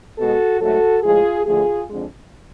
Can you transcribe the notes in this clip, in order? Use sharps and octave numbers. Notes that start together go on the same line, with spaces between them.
B2 G#3 F#4 A4
G#2 F#3 A3 F#4 A4
A2 F3 G#3 F4 G#4
D2 D3 F3 A3 F4 G#4
F2 D3 G#3